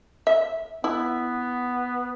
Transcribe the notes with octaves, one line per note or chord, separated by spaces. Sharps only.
E5
B3 E4